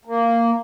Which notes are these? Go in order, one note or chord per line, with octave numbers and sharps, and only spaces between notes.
A#3